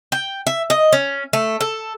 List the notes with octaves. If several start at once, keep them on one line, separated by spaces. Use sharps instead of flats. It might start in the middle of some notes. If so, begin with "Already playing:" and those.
G5
E5
D#5
C#4
A3
A4